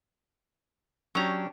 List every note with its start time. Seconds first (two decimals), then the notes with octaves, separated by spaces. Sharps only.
1.15 F#3 C#4 D4 G4 A#5